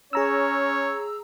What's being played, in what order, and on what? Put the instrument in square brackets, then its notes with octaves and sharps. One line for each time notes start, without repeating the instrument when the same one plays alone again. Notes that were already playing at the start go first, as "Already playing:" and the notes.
[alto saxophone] C#4 [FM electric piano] G#4 A#5 E6 [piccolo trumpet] C#5